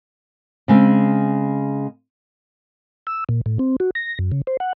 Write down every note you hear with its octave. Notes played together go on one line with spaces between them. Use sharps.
C#3 G#3 C4
E6
A#2
A2
C4
F#4
A#6
F#2
C#3
C5
F#5